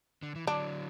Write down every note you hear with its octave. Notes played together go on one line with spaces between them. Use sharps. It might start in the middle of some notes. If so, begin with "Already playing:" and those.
D3
E3
D3 F#3 D4